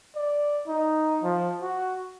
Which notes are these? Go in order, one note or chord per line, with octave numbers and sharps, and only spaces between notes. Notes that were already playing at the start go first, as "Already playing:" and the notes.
D5
D#4
F3
F#4